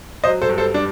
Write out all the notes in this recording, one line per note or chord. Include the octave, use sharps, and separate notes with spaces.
F#3 C5 D#5
A4 C5
G2
A4 C5
G3 D4